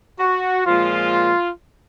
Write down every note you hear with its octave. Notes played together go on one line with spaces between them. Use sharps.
F#4
A#2 F3 G#3 F4